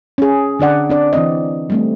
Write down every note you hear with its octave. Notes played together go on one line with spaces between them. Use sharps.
C#4 G#4
D3 D4 D5 F#5
C4 D4 D5
E3 C4 D#5
G3 A3 C4